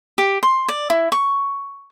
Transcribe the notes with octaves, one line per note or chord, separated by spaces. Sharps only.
G4
C6
D5
E4
C#6